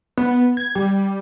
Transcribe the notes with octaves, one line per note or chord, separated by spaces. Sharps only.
B3
G#6
G3